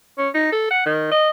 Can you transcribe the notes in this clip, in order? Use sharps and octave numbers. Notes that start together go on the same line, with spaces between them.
C#4
D#4
A4
F#5
D#3
D#5